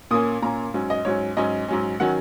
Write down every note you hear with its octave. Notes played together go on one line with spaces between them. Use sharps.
A#2 A#3 C#4 D#6
A#2 A#3 C#4 A#5
G#2 F#3 C#4
D#5
G#2 F#3 C#4 C#5
G#2 F#3 C#4 D#5
G#2 F#3 C#4
D#3 F#3 C#4 F#5